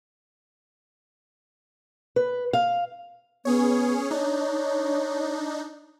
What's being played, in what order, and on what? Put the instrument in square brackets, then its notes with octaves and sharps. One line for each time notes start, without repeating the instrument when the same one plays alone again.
[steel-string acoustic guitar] B4
F5
[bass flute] B3 [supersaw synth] C#4 G#4 C#5
[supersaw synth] D4 D#4 [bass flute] C#5